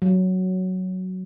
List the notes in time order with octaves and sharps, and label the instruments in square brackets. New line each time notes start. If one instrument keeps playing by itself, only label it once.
[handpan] F#3